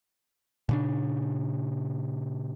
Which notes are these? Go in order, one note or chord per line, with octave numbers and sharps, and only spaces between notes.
A#2 C#3 D4